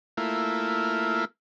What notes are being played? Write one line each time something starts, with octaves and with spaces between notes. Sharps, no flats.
A3 A#3 E4 F4